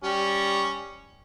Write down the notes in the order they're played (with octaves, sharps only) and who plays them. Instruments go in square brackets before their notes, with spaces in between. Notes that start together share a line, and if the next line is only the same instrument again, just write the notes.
[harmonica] G3 C#4